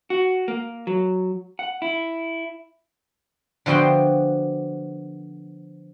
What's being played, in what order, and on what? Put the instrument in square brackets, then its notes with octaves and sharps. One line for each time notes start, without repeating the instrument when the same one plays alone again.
[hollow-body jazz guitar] F#4
A#3
F#3
F#5
E4
[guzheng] D3 F3 B3 F#4 G5 C6